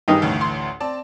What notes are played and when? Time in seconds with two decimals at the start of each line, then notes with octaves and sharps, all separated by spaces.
0.08 G2 D#3 D#4 G4 G#4 G5
0.22 A1 D2 A2
0.41 C6
0.80 C4 D5 A5